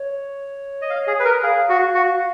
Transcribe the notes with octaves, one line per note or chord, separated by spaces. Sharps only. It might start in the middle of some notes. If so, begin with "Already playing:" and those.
Already playing: C#5
D#5
F5
G#4
B4
A#4
G#4 F5
F#4
F#4